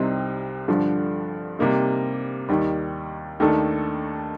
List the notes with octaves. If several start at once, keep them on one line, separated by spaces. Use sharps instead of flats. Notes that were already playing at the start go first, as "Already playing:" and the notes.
Already playing: C2 C3 G3 C4 D#4
G2 D3 F3
C3 G3 A#3 D#4
D#2 D#3 G3
D#2 D#3 A3 D4 A4